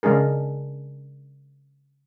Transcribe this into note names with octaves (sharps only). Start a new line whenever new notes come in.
C#3 G#3 D4 G#4 A#4